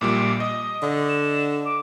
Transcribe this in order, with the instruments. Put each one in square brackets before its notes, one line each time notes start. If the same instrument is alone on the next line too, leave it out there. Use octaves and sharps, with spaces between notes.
[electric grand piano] A#1 A#2 G3 [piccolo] D6
[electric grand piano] D#5 [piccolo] D#6
[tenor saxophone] D3
[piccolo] E7
D6